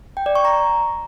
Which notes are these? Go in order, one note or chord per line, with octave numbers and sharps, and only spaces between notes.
G5
D5
C#6
A#5